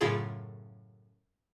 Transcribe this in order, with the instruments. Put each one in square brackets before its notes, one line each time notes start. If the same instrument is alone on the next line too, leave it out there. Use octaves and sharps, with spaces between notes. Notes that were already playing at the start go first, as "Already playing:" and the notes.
[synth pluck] F#2 A2 C#3 E4 F4 G#4